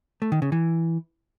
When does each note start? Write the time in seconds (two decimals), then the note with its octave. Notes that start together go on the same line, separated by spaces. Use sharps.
0.22 A3
0.32 D#3
0.42 C#3
0.52 E3